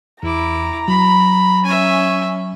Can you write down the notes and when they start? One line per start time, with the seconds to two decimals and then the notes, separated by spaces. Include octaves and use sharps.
0.23 E2 E4 A#5 D6
0.88 F#3 B5
1.65 C#4 E5 G#5